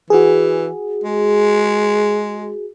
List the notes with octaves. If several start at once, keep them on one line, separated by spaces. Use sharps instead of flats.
E3 F#4 G#4
G#3